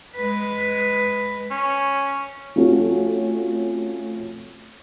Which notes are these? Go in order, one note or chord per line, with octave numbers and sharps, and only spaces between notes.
G#3 B4
C#4
F3 A3 C4 C#4 F#4